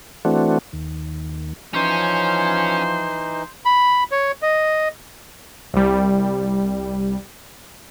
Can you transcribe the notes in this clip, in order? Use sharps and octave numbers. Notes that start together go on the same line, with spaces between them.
E3 A3 C4 D4 F#4
D#2
E3 F3 C#4 D#4 C5
B5
C#5
D#5
C2 G3